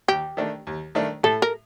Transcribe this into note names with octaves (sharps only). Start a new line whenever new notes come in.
D#2 G4
D#3 A3 D4
D#2
D#3 A3 D4
A2 A4
A#4